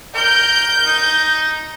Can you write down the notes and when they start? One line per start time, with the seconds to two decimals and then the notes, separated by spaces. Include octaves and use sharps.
0.15 A#4 G6
0.85 D#4